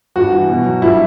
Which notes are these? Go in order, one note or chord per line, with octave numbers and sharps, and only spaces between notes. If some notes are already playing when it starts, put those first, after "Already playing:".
G2 F#4
E3
B2
F#3
G2 E4